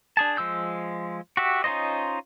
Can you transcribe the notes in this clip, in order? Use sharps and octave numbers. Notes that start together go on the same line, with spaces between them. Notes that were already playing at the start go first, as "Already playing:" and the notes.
D4 G#4 A5
F3 G#3 E6 G6
F#4 G4 E5
C#4 D#4 F4 C5 D#5